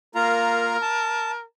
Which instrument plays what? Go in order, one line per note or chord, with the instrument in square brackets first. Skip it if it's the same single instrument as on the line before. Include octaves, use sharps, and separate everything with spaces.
[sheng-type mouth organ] A#3 F4 A#5 [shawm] A#4
[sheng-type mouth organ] A5